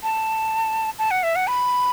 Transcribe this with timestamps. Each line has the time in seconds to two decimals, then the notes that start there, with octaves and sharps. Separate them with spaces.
0.03 A5
0.99 A5
1.11 F#5
1.23 E5
1.36 F#5
1.47 B5